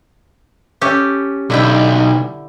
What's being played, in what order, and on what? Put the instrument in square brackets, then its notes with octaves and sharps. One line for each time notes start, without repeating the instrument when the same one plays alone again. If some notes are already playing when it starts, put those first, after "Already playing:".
[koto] C#4 G4 A4
[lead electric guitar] B1 [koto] D3 E4 G5